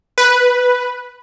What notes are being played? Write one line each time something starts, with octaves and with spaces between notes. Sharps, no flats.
B4